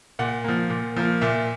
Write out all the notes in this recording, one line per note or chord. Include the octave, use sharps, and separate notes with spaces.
A#2 F#5
F3 A#3
A#2
F3 A#3
A#2 E5